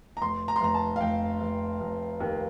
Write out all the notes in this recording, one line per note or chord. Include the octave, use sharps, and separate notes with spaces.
A#5
F1 C6
A#5
C6
F1 A#5
A5
F5
F1 G5
F1
F1
D#2